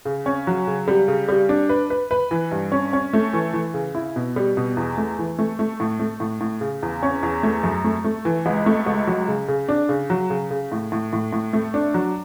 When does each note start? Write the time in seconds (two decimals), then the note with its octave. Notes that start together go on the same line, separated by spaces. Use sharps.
0.05 C#3
0.26 C#4
0.47 F#3
0.67 C#3
0.88 G3
1.08 C#3
1.28 G3
1.49 D4
1.69 B4
1.90 B4
2.11 B4
2.31 E3
2.51 G2
2.72 C#4
2.93 C#4
3.13 A3
3.33 E3
3.53 E3
3.74 C#3
3.95 E4
4.16 B2
4.36 G3
4.57 B2
4.77 E2
4.98 A3
5.19 E3
5.39 A3
5.59 A3
5.80 A2
6.00 A3
6.20 A2
6.41 A2
6.61 C#3
6.82 E2
7.03 C#4
7.23 E2
7.43 A3
7.63 F#2
7.84 A3
8.04 A3
8.25 E3
8.46 C#2
8.66 A3
8.87 C#2
9.07 F#3
9.28 C#3
9.48 C#3
9.69 D4
9.89 C#3
10.10 F#3
10.30 C#3
10.51 C#3
10.72 A2
10.92 A2
11.13 A2
11.33 A2
11.53 A3
11.74 D4
11.94 F#3